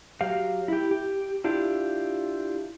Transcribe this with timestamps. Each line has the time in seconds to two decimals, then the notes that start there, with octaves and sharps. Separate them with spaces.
0.21 F#3 G4 F5
0.68 E4 G4
0.91 G4
1.44 D4 E4 F4 G4